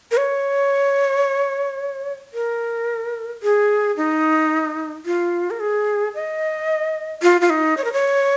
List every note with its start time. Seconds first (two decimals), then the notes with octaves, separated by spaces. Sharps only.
0.11 A#4
0.17 C#5
2.34 A#4
3.43 G#4
3.97 D#4
5.06 F4
5.51 A#4
5.60 G#4
6.15 D#5
7.23 F4
7.41 F4
7.50 D#4
7.77 C#5
7.84 A#4
7.93 C#5